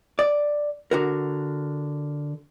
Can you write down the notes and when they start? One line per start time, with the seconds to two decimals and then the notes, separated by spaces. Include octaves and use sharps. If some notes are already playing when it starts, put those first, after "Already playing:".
0.19 D5
0.91 D3 F#4 A#4